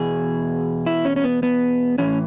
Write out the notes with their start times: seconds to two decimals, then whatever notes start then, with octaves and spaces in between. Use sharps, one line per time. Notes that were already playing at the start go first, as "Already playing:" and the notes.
Already playing: E2 B2 G#4
0.86 E4
1.05 C#4
1.16 C#4
1.24 B3
1.43 B3
1.98 A2 E3 C#4